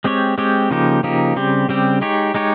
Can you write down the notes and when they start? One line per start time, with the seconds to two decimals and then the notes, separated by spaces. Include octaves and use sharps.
0.04 G#3 C4 G4 C#5
0.38 G#3 C4 G4 C#5
0.70 C#3 F3 A#3 D#4 G4
1.03 C#3 F3 A#3 D#4 G4
1.36 C#3 G3 C4 G4
1.68 C#3 G3 C4 G4
2.01 G#3 D#4 G4 C#5
2.34 G#3 D#4 G4 C#5